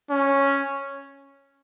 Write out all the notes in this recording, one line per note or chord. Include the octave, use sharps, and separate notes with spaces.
C#4